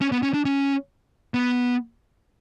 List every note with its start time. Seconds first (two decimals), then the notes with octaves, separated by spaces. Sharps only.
0.01 C#4
0.12 B3
0.23 C#4
0.34 D4
0.45 C#4
1.34 B3